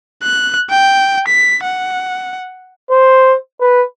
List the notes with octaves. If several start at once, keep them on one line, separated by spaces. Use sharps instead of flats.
F#6
G5
B6
F#5
C5
B4